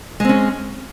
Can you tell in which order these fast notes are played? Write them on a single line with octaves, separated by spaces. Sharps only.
G#3 C4 C#4